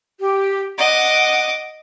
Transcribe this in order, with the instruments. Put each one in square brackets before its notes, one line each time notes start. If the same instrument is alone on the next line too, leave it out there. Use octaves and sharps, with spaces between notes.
[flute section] G4
[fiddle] D#5 D6 [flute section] F#5